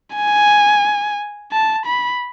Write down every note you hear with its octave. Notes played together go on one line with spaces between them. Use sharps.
G#5
A5
B5